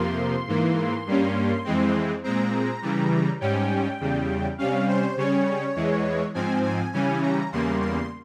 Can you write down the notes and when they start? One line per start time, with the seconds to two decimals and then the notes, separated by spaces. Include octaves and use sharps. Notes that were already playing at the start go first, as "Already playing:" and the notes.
Already playing: F2 C3 F3 A#3 C6
0.47 G#2 E3 A#3
1.06 G2 G3 A#3 C#4
1.65 F2 E3 G#3 C4
2.24 A#2 G#3 C4 A#5
2.82 C#3 E3 G3
3.41 G#2 G3 C#4 G5
4.00 E2 C#3 G3
4.58 C3 G3 C#4 F5
4.88 C5
5.16 C#3 G3 C#4 C#5
5.76 E2 E3 G#3
6.34 G#2 F3 C4 G#5
6.63 G#5
6.93 C#3 E3 G3 C#4 G#5
7.22 A#5
7.52 E2 C#3 G3 A#3 C6
7.81 C6